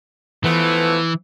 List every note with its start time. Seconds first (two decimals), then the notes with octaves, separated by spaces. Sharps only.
0.44 E3 F3 A3 B3